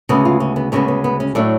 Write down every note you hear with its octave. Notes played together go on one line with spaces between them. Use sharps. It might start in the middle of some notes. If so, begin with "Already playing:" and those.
D2 C#3 G#3 B3 G#4
F4
C#4
B3
D2 C#3 G#3 B3 C#4
B3
B3
C#4
A2 F#3 A3 D4